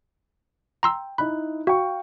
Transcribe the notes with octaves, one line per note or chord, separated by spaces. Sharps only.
G5 A#5 C6 E6
D#4 E4 B5 F#6
F#4 F5 G5 C#6